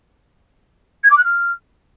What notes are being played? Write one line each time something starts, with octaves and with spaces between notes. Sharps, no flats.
G#6
D6
F#6
F6